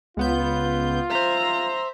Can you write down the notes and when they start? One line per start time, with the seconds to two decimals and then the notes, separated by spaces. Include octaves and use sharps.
0.17 C#2 B3 F4 G6
1.11 C5 E5 A#5